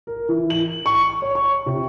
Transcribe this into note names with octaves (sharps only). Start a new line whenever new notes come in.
A#4
E3
F#7
C#6
C#5
C#6
C3